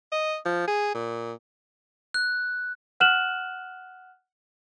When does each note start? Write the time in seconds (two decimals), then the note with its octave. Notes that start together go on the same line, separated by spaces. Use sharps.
0.12 D#5
0.46 F3
0.67 G#4
0.94 A#2
2.14 F#6
3.00 F#5 F6 F#6 E7 F#7